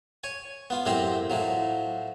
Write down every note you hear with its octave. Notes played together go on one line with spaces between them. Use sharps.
C#5 G#5
B3 F4
F#2 A2 C4 G4 C5 A#5
A2 F3 F#3